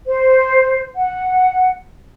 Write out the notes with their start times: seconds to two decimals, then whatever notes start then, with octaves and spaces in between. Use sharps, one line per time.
0.07 C5
0.95 F#5